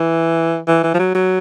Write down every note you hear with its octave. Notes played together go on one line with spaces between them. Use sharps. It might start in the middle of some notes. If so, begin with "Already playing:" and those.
Already playing: E3
E3
E3
F3
F#3
F#3